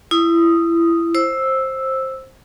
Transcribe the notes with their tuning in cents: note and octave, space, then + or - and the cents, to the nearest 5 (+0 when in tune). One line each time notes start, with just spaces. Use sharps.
E4 +25 D#6 +0
C5 +15 E6 +0